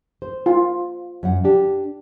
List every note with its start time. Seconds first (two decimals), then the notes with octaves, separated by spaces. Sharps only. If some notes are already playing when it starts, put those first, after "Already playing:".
0.22 C5
0.46 F4
1.23 F#2 F#5
1.44 D4 G4